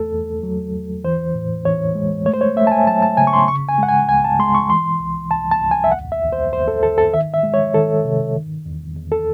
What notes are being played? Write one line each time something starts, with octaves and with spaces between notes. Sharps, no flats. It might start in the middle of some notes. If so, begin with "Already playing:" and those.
Already playing: E2 A3 A4
E2
F#3
E2
E3 C5
A2
E3 C#5
G#3
A3 C#5
C5
C#5
A3 E5
A5
G#5
F#3 A5
A5
C#3 G#5
C#6
C6
C#3 C#6
G#5
G#3 F#5
G#5
C#2 G#5
A5
G#3 C6
C#6
E3 C6
C2
C2 A5
A5
C2
G#5
E5
D#2 F#5
E5
D#2
C5
D#2 C5
A4
D#2 A4
A4
D#3 E5
E5
G#3
C#5
D#3 A4
C3
D#3
E2
E2
A4